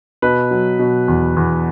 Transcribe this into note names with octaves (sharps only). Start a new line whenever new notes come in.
B2 B4
F#3
B2
E2
E2